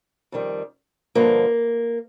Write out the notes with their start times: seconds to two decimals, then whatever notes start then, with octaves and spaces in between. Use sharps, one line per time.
0.32 F2 D#3 G3
1.15 G2 D3 F3 A#3